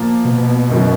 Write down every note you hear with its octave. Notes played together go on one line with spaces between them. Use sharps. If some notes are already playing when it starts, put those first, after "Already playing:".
Already playing: A#2 F3 A#3
B2
F#1 F#2 D#3 F#3